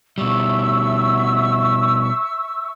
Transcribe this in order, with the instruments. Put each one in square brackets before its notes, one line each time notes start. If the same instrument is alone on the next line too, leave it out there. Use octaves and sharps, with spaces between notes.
[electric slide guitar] B2 G3 [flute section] E5 C#6 E6